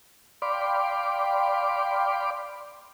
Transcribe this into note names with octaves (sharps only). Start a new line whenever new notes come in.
D5 F5 G5 B5 C6 D6